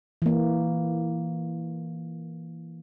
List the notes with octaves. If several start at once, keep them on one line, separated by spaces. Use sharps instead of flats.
E3 A#3